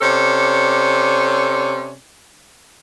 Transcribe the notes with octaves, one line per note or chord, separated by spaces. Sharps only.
C3 C#4 A4 D5